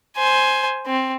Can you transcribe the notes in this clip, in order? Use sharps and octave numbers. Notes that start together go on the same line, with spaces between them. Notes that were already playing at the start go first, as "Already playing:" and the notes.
C5 G#5
C4